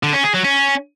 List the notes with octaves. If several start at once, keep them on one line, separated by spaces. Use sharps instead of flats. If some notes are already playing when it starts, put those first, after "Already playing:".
D3
C#4
G#4
F#3
C#4